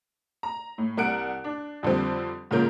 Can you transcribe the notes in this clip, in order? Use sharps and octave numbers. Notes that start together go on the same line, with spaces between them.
A#5
A2
C2 A#4 F#5 F#6 D7
D4
F2 D3 G3 C4
G#2 C#3 F3 A#3 A#4 G6